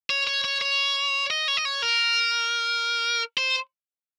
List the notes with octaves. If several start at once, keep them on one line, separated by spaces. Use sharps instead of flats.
C#5
C#5
C#5
C#5
D#5
C#5
D#5
C#5
A#4
C5